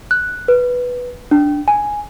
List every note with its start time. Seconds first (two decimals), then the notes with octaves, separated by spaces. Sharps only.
0.11 F#6
0.48 B4
1.31 D4
1.68 G#5